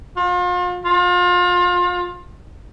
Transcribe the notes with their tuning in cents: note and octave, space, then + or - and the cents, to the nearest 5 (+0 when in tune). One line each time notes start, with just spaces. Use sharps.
F4 +40
F4 +30